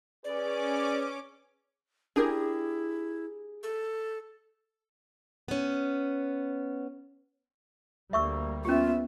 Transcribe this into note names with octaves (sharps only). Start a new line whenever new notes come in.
C#4 G#4 B4 D5 D6
D4 E4 G4 G#4 A#4
A4
B3 C#4
D2 G3 A#3 E5 C#6 E6
B3 C#4 F4 G4 E5